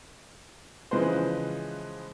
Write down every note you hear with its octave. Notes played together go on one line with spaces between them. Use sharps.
C#3 E3 F3 G#3 B4 C5